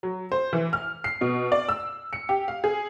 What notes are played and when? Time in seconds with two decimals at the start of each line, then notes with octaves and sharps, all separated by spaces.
0.03 F#3
0.32 C5
0.53 E3
0.73 F6
1.04 C7
1.21 B2
1.52 D5
1.69 E6
2.13 C#7
2.29 G4
2.48 F5
2.64 G#4